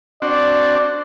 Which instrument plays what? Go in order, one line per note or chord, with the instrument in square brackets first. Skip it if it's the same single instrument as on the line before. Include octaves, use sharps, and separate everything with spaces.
[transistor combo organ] C4 D4 F#4 [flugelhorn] D5